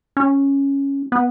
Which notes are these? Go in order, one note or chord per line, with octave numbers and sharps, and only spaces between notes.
C#4
B3